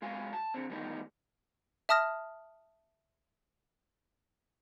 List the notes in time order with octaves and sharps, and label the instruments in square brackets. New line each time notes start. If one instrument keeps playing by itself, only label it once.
[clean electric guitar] B1 G#3 F#4 F5 G#5
A5
D3 C4
D#3 E3 G3 A3 B3 D#4
[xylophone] E5 A5 D#6 F6 A#6